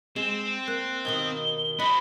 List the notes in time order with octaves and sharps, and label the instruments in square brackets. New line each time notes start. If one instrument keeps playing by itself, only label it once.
[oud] G#3 [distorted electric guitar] C4 [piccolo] E7
[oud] A#3 [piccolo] F#6
[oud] D#2 B2 D#3 [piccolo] G7
[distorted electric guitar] F#4 C5 [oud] D#5 [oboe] B5